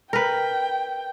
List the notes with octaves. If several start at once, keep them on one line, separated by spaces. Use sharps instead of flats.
A#4 B4 G5